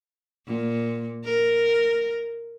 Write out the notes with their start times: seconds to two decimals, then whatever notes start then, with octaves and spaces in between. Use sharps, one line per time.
0.47 A#2
1.24 A#4